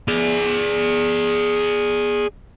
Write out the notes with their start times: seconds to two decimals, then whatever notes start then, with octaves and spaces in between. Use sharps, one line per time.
0.08 G#4 D5